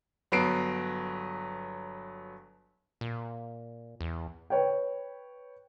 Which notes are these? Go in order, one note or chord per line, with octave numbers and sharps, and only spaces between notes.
G1 F#3 B3 B4 C7 D7
A#2
E2
B4 C#5 G5